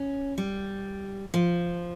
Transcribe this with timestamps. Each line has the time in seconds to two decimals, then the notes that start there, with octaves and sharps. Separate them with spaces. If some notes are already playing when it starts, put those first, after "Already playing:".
Already playing: C#4
0.38 G3
1.34 F3